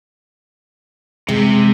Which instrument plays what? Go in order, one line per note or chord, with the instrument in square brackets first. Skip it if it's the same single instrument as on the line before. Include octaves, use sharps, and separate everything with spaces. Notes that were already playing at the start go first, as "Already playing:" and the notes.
[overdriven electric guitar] C3 [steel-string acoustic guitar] G#3